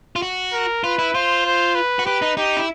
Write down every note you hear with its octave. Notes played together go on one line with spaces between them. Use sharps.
F4
F#4
A#4
F4 B4
E4
F4 C5
C5
B4
F#4
G4 B4
D#4
D#4 G4
E4